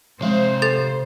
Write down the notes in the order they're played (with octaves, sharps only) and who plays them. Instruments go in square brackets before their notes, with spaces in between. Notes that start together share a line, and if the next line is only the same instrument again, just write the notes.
[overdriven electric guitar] C3 F5 [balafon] F3 G#3 C4 [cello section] C5
[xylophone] A4 A6